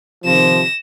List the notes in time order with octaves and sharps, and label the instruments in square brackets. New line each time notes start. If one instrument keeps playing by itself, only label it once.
[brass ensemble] C3 D#3 F3 [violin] A#6 E7